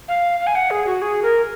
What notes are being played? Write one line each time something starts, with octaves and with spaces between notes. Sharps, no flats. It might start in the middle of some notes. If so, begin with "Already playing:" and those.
F5
F5
G#5
F#5
G#4
F#4
G#4
A#4